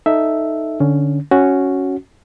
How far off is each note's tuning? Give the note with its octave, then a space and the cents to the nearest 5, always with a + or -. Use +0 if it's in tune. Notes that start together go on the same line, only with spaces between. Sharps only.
D#4 +0 A4 +0 E5 +0
D3 +0 C#4 +10
C#4 +0 F#4 +0